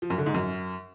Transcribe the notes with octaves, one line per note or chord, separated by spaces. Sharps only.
F3
F#2
D3
G#2
F#2